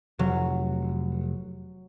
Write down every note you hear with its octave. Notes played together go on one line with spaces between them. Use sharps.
F1 F#3